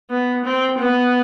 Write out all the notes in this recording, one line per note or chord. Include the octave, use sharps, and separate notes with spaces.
B3
C4
B3